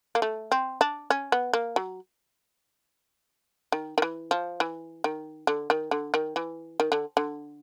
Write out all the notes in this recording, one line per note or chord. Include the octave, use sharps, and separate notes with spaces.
A#3
A3
C4
D4
C#4
B3
A#3
F#3
D#3
D#3
E3
F3
E3
D#3
D3
D#3
D3
D#3
E3
D#3
D3
D3